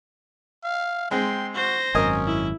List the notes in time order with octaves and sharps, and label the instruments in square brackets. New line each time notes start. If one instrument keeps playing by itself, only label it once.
[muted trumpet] F5
[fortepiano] G#3 C4 [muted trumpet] G5 [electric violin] C6
[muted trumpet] F#4 [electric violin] C5 A#6
[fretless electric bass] G#1 F#2 [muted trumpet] C#4 [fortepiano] A#4 D#5 G#5
[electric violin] E4